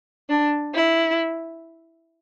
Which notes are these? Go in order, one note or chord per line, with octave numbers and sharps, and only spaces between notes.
D4
E4